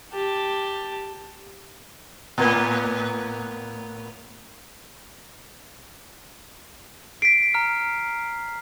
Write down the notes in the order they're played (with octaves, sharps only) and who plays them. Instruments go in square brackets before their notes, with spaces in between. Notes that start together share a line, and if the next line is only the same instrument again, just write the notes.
[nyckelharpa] G4 A5
[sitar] A2 A#3 B3
[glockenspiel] B6 C7 [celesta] D7
[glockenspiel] A#5 F6